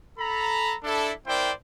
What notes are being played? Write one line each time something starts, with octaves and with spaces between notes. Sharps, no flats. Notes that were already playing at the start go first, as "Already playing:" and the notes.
A4 A#5 B5
D4 E4 A4
C4 E4 A#4 C5 D5 G5